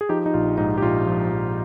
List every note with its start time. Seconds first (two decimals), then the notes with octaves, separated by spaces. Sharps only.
0.01 G#4
0.09 F3 D#4 G4
0.26 D#4
0.34 A#1 F4
0.58 G#2 D#4
0.78 G4
0.82 A#1 F4
1.07 F3
1.31 A#1